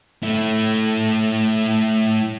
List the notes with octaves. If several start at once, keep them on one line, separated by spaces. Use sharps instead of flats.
A3 E4